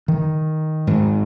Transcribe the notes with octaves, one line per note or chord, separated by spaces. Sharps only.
D#3
G#2